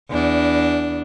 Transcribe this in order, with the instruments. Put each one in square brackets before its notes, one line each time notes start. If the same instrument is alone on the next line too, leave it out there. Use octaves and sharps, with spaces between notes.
[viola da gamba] E2 D4